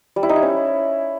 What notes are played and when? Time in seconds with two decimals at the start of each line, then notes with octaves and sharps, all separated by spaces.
0.16 G3
0.23 E4
0.29 D#4
0.36 E4
0.42 C#4